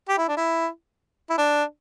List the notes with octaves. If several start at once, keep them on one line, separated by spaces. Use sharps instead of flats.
G4
E4
D4
E4
E4
D4